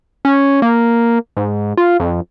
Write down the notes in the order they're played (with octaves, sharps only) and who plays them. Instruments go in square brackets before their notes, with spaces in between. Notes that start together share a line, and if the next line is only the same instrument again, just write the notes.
[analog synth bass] C#4
A#3
G#2
F4
F2